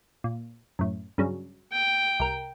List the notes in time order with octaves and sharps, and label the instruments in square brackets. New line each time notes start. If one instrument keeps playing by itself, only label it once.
[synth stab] A#2
F#2 A2
G2 C#3 F#3
[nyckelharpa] G5
[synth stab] C2 A#4